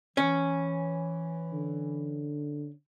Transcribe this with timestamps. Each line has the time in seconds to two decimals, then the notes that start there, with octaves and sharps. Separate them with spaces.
0.17 E3 C#4
1.53 D3